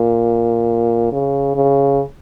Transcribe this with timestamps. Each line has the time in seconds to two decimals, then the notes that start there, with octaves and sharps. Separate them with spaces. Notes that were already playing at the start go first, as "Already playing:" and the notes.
Already playing: A#2
1.12 C#3
1.55 C#3